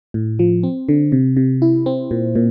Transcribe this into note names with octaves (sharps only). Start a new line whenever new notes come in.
A2
F3
C4
D3
C3
C3
E4
C4
A#2
A#2